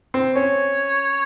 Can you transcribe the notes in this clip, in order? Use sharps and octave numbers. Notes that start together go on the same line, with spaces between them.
C4
C#4 C#5